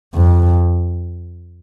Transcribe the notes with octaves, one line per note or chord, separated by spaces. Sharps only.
F2